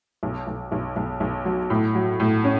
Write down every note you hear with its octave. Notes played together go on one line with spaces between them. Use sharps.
B1
B1
B1
B1
B1
F#3
A2
F#3
A2
C#4